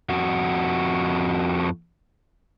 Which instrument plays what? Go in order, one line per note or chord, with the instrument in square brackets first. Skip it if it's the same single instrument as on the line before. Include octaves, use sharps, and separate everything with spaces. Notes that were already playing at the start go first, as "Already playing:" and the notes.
[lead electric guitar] F2 F#4